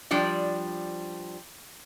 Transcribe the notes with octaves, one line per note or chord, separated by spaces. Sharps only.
F3 G3 D4 D5